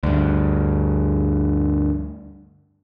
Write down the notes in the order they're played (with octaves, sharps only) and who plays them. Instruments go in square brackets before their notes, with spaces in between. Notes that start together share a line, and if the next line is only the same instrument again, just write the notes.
[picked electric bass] D2 G2